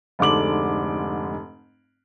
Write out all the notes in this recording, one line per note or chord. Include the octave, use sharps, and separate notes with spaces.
F1 G#2 D3 D6 F#7